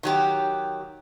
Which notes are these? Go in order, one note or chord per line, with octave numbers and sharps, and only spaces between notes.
D#3 F#3 G4